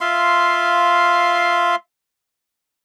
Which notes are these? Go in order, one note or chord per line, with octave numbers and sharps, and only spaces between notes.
F4 E5 F5 C6